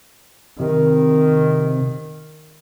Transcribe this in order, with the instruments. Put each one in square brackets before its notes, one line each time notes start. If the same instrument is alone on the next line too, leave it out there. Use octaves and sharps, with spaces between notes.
[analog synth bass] C3 [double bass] D#3